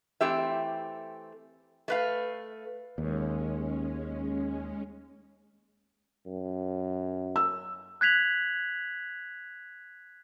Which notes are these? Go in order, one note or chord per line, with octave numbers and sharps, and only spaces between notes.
E3 A3 C4 G4 E5
A3 B4 F5
D#2 G#3 C#4
F#2
E6
F#6 G#6 B6 F7 F#7